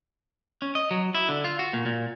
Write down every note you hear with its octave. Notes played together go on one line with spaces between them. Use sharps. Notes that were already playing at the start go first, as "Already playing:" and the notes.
C#4
D#5
F#3
E4
D3
F4
F#4
A#2
A#2